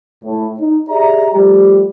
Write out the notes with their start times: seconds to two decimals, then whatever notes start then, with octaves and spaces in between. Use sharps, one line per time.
0.24 A2
0.59 D#4
0.89 G4 G#4 D5 E5 A#5
1.33 F3 G3 A3 G4